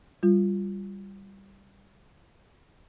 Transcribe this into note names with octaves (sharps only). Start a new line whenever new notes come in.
G3 F4